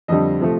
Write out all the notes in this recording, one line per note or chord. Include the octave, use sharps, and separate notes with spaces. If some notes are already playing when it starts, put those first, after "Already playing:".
F2 D3 G3 D#5
C3 F3 A3